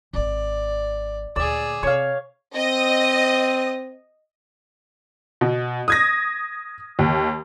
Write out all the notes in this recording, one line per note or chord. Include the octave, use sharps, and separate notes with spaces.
D#1 G#1 D5
D2 A#2 G#4 D5 E6
C3 C#5 F5
C4 D#5 D#6 A#6
B2
D#6 G#6 A#6
D#2